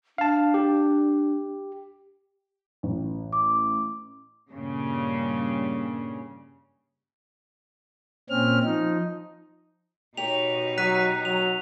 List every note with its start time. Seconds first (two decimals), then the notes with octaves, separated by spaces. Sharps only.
0.18 D4 F5 A5
0.54 G4
2.83 A1
3.33 D6
4.50 G2 A#2 C#3 G3
8.30 A#2 C4 C#4 F6
8.64 F3 D#4
10.17 B2 D#4 G4 C#5 F7
10.78 F#3 F#6 B6 D#7
11.25 F#3 F7